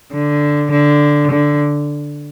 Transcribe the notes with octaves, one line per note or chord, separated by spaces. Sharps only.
D3
D3
D3